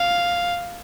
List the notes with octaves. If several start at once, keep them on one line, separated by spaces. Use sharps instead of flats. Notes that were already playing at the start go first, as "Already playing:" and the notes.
Already playing: F5